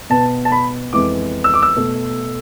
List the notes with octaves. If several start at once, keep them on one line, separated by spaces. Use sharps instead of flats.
B2 B3 A5
A5
B5
F2 E3 G#3 B3 D6
E6
D6
E6
B2 A3